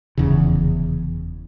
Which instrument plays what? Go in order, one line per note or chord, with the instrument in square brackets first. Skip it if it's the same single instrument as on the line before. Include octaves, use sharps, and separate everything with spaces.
[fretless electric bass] F1 E2 C#3